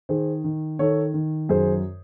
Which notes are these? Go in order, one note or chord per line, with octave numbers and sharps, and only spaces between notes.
D#3 G#4 C5
D#3
D#3 A4 C#5
D#3
F#2 G#4 C5